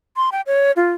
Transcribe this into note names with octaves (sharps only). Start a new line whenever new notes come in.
C6
G5
C#5
F4